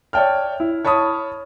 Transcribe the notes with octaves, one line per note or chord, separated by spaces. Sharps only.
C#5 D5 E5 G5 A5 F6
E4
C#5 A5 B5 C#6 D#6